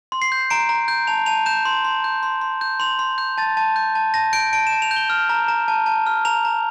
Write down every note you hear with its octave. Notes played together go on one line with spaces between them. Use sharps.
C6
C7
G6
A#5 D7
A#5
G6
A5 F7
A5 F7
G6 E7
C6
C6
G6
C6
C6
G6
C6 F7
C6
G6
A5 A6
A5
G6
A5
A5 A#6
G6 D7
A5 D7
E7
A5
F7
G6
G7
F6
A#5
A#5
A5
A5
F6
A#5 F7
A#5